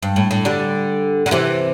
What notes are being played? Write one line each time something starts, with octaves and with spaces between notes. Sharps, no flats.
G2
A2
A2
D3 G3
D3
C3 E3